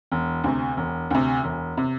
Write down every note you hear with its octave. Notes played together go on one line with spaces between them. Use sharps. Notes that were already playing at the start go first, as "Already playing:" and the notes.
E1
D2 C3
E1
D2 C3
E1
C3